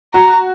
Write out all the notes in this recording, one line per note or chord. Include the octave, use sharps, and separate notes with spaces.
F#4 A#5